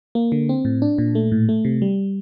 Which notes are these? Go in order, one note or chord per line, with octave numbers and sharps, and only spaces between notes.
A#3
D3
C4
A2
D4
A#2
A3
A2
A3
C3
G3